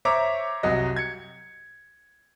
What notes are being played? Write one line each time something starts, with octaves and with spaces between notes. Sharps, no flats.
C5 C#5 E5 A#5 D6
C2 F#3 D#5
G#6 C#7